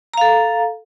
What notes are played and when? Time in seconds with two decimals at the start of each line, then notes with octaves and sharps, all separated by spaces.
0.14 A#5
0.17 F5
0.21 A4